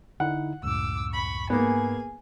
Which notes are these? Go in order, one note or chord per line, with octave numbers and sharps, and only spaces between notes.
D3 D#4 E4 F#5
C#2 F#2 A2 D6 E6
B5 C#6
G#2 A#3 B3 G#4 G#5